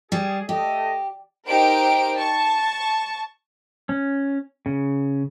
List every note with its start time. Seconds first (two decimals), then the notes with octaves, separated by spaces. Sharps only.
0.12 G3 G4 G#4
0.49 A3 G4 D#5
1.47 D#4 G4 A#4 C5 D7
2.16 A5 C#6
3.89 C#4
4.66 C#3